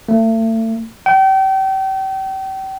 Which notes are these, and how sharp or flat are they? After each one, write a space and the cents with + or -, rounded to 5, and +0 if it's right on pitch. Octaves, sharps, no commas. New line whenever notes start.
A3 +35
G5 -35